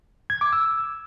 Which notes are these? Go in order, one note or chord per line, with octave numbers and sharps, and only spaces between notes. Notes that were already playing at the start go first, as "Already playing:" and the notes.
G#6
D6
E6